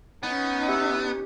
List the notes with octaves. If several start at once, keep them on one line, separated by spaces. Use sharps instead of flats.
B3 C#4 D#4
G4 E5